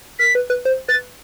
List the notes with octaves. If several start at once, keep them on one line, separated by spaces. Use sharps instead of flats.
A#4 B6
B4
B4
C5
B4 A6